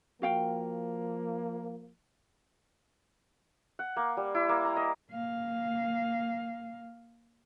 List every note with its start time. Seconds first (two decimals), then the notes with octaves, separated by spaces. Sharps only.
0.22 F3 A#3 F#4 F5 G5
3.79 F#5
3.97 A#3
4.17 G3
4.35 E4
4.49 A#3
4.65 A#5
4.76 D#5
5.10 A#3 F5